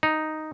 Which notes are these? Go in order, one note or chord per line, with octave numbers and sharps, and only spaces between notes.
D#4